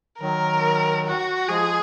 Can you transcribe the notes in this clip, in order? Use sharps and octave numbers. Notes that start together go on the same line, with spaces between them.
D#3 F#3 A#4
F#4
F3 G#3 G#4